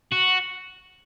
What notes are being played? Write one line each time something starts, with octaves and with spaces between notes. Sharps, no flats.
F#4